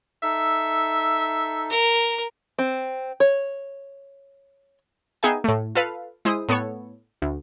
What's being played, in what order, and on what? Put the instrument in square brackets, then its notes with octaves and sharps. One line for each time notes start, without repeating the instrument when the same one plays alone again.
[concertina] D#4 A4 [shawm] E5
[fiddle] A#4
[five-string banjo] C4
C#5
[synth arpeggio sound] B3 D#4 G#4 E5 G5 G#5
A2 A3
F4 A4 B4 F5
G#3 E4 C5 D#6
A2 B3 A4 C#5
D2